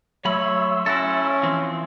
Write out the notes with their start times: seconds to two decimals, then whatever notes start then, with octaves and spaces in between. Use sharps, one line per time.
0.25 F#3 A3 C#5 E5 B5 C6 E6
0.86 C#4 E4 F#4 A4
1.43 E3 F3 C4 C6